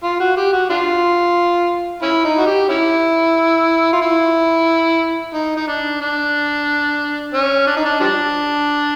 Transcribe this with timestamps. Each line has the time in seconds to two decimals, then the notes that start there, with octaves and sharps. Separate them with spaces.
0.03 F4
0.20 F#4
0.37 G4
0.53 F#4
0.70 D4 F4
2.02 C#4 E4
2.25 D#4
2.38 F#4
2.46 G4
2.69 C#4 E4
3.93 F4
4.02 E4
5.34 D#4
5.57 D#4
5.67 D4
6.01 D4
7.34 C#4
7.67 D4
7.76 D#4
7.85 D4
8.00 F3 G3 D4